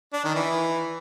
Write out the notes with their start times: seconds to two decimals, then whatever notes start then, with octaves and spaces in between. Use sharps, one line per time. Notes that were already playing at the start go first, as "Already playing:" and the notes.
0.13 D4
0.24 D#3
0.35 E3